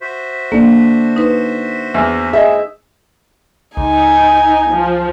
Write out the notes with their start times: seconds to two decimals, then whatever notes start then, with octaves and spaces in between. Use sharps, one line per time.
0.01 F#4 C5 E5
0.52 A#3 D4 A4
1.16 D#4 B4
1.94 E2
2.33 E4 F#4 G#4 C5 D#5 E5
3.77 C#2 D#4 G#5
4.72 F3